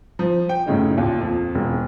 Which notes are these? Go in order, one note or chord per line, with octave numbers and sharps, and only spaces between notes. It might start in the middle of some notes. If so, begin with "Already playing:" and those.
F3
G5
F#2 A2 C#3 D#4
D#2 A#2
F2
E1